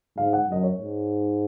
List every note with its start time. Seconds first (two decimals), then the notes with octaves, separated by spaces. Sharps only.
0.17 G#2 F5
0.33 F#5
0.48 F#2 D#5
0.63 C#5
0.78 G#2